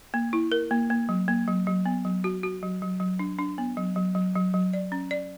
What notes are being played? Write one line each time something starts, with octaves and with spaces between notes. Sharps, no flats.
A#3
E4
A#4
A#3
A#3
F#3
A#3
F#3
F#3
B3
F#3
F#4
F#4
F#3
F#3
F#3
D4
D4
B3
F#3
F#3
F#3
F#3
F#3
D5
C#4
D5